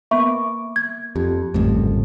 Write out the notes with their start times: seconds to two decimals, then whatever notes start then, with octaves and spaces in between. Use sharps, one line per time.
0.11 A#3 B3 E5 B5 C#6 D6
0.76 G#6
1.16 F2 G4
1.54 D1 G#1 F2 C#3 G3 A3